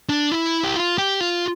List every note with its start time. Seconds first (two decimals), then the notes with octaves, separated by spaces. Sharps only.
0.09 D4
0.31 E4
0.64 G4
0.76 F4
0.98 G4
1.20 F4